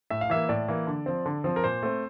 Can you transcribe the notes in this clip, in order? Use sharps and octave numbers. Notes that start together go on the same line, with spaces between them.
A2 E5
F5
E3 A#3 E5
A2 D5
E3 A#3
D3
F3 C4
D3
F3 C4
A#4
A#2 C5
A3 C4